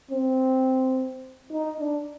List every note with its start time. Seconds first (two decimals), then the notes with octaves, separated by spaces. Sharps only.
0.11 C4
1.52 D#4
1.80 D4